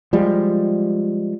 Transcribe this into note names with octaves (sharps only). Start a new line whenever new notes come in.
F3 G3 G#3